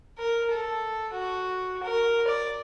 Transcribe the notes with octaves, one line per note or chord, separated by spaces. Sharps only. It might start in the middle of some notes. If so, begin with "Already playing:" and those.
A#4
A4
F#4
A#4
D5